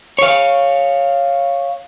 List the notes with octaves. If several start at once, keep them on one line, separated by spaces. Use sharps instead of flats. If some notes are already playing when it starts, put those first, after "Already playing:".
C#5 F5